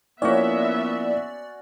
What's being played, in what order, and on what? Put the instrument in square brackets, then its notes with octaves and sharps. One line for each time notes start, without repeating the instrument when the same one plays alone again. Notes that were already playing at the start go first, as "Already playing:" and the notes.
[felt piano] F3 A#3 E4 [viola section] B3 E5 [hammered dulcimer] C#4 F#4 [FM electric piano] D5